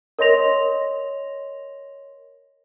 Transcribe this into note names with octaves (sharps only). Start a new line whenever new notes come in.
A#4 C#5 D#5 C6 A#6 F7